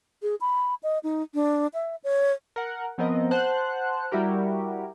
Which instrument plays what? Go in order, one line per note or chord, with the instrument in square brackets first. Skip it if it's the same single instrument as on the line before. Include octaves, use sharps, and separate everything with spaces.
[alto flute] G#4
B5
D#5
D#4
D4
E5
C#5
[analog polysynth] A#4 F#5
F3 B3 C4 A#4 D#5
C5 F#5 A5 F#6
G3 E4 F#4 G4 A#4